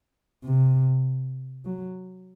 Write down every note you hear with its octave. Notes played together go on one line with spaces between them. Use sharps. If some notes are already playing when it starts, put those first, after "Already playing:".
C3
F#3